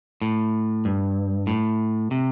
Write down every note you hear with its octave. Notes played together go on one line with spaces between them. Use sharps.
A2
G2
A2
C3